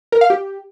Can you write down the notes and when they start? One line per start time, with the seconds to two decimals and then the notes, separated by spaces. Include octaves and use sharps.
0.12 A#4
0.21 F5
0.30 G4